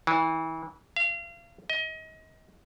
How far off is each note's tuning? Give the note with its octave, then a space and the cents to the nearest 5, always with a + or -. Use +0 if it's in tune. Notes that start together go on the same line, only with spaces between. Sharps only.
E3 -30
F5 -35
D#5 +30